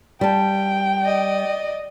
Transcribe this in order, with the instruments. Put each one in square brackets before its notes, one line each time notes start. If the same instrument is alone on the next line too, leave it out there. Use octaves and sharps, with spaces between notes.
[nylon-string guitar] G3 A5 [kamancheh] G5
[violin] D5 D#5